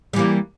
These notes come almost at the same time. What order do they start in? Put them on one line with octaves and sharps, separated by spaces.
G3 E3 A#3